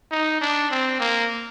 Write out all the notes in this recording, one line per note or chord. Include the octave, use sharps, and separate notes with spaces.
D#4
D4
C4
A#3